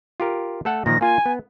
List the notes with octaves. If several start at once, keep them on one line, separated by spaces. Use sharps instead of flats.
F4 G4 A#4
A3 A4 F#5
A#2 D#3 F3 A#6
A#3 F4 G#5
B3